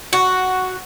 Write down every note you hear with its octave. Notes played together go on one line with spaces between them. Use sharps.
F#4